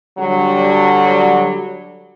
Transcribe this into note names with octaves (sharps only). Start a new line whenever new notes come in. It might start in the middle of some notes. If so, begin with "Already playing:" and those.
D3 F#3 G3